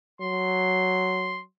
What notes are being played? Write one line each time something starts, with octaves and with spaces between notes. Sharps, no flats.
F#3 C6